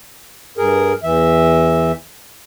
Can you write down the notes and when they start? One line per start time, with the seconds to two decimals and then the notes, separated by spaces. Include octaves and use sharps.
0.57 G2 G#4 A#4
1.03 E2 E3 E5